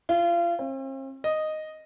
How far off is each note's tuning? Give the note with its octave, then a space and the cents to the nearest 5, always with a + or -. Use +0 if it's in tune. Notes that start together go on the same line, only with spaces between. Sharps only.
F4 -30
C4 +45
D#5 -5